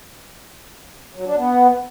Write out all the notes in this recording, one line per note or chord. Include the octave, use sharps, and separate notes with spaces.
F#3
D4
B3